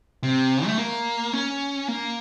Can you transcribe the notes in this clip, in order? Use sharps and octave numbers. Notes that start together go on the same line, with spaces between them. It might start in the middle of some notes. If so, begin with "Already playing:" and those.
C3
A3
A#3
C#4
A#3